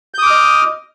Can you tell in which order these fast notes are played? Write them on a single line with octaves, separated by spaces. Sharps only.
G6 D#6 D6 F6 D#5